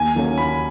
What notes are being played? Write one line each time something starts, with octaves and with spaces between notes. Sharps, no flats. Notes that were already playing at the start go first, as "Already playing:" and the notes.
Already playing: D#2 G#5
D#3 F#3 A#3 C#4
D#2 B5